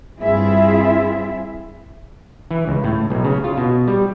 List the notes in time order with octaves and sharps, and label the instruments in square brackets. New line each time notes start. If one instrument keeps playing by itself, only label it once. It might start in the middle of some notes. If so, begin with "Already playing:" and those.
[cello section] G2 C4 E4 F4 G#4 E5
[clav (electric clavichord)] E3
C#2
A2
B1
C#3
F4
B2
G3